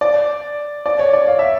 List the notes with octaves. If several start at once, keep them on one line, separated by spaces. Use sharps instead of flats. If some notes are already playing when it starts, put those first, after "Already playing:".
D5
D5
C#5
D5
F5
E5